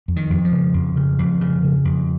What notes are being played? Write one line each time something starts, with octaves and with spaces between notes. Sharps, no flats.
F2
D#3
F2
F3
C#3
F2
C#3
F2
C#3
C#3
F2